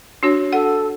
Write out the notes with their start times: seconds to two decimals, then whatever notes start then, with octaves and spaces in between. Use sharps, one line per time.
0.23 D4 F#4 C#5
0.53 A4 F#5